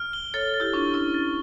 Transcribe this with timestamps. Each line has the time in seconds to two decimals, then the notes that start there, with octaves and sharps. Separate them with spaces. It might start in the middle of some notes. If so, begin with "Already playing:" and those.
Already playing: F6
0.13 G7
0.34 A4 C#5 A6
0.54 A6
0.60 E4 G4
0.73 D4 F4 C#6
0.94 C#4 E4 C#6
1.14 A6